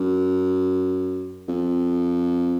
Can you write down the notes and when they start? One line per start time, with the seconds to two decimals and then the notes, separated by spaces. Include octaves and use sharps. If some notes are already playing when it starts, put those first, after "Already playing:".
Already playing: F#2
1.48 F2